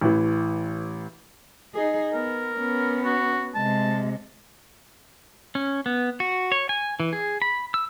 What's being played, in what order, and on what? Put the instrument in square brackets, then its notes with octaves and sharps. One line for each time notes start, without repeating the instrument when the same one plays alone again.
[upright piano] A1 E3
[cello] D#4 G#4
[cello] B3 [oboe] A#4
[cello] B3 C#4
[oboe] F#4
[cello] C3 G#3 [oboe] A5
[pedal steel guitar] C#4
B3
F#4
C#5
G#5
E3
G#4
B5
E6